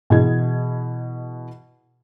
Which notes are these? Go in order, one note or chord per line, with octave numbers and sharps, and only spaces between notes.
B2 E3 G#4 D#5 G#6